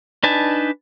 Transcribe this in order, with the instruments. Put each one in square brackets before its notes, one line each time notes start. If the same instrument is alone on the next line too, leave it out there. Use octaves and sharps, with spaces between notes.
[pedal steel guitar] D4 D#4 B4 G#5 A5